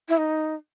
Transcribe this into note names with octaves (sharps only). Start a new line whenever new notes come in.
E4
D#4